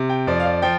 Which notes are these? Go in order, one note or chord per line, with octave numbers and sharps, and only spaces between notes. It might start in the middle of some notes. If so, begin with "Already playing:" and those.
Already playing: C3
G5
F2 F3 D5
F5
D5
F3 G5